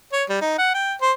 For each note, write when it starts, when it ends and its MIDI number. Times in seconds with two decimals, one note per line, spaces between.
0.13 0.24 73
0.29 0.37 55
0.41 0.55 63
0.58 0.74 78
0.74 0.94 79
1.02 1.12 72